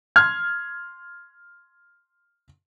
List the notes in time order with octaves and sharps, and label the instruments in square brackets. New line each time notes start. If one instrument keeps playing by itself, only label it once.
[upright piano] C6 F6 G#6